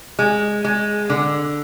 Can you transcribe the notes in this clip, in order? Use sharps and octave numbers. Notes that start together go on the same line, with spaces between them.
G#3
G#3
D3